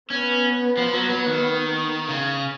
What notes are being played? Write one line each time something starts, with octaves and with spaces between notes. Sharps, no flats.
B3 C#4
F3
F#3
F#3
D#3
C#3